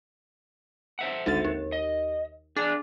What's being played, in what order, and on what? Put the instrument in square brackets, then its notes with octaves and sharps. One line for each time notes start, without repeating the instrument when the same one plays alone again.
[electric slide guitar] C5 E5 F#5
[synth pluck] G#1 D2 A6
D#2
[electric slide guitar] D#5
[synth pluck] D4 [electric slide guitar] G#4 D5